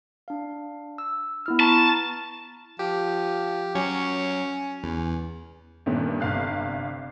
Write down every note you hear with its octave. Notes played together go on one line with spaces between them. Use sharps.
D4 F5
E6
B3 E4 F6
A5 A#5 C#6
F3 G4
F#3 C#4
E2
G2 A#2 D#3 A3 B3 C#4
G1 C3 F5 F#6